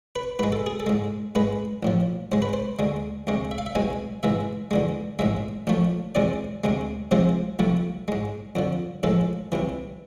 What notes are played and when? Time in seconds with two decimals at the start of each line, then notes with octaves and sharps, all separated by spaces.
0.16 B4
0.39 G#2 G#3 B4
0.52 A4
0.66 G#4
0.80 A4
0.87 G#2 G#3
1.35 G#2 G#3 B4
1.83 A1 A2 F3
2.32 G#2 G#3 C5
2.42 B4
2.53 C5
2.79 D2 D3 G#3
3.27 D2 C3 G#3
3.51 E5
3.58 F5
3.66 E5
3.75 C2 B2 G#3 G#5
4.23 G#2 E3 G#3 E5
4.71 E2 D3 G#3
5.19 A1 G#2 G#3 E5
5.67 A1 A2 F3 A3
6.15 E2 C3 G#3 D5
6.64 D2 C3 G#3
7.11 C2 C3 F3 G#3 C5
7.59 C2 C3 F3 A3
8.08 G#2 G#3
8.55 F2 D3 F3
9.03 A1 A2 F3 G#3 A4
9.52 C2 C3 E3